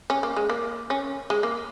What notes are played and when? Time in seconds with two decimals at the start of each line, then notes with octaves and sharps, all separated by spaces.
0.10 C#4
0.23 A#3
0.36 G#3
0.49 A#3
0.90 C#4
1.30 G#3
1.43 A#3